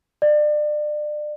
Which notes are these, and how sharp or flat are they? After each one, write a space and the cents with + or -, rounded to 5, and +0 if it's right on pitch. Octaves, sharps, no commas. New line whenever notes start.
D5 +30